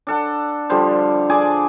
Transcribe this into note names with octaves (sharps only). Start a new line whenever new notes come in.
D4 A4 F#5
D3 F3 G3 C5
G#4 D5 G#5 A5